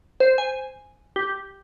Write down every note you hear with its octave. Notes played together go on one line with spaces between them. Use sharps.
C5
G#5
G4